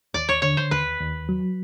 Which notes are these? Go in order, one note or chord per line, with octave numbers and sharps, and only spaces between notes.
D#2 D5
C#5
D3 C#5
C5
D#2 B4
D#2
F#3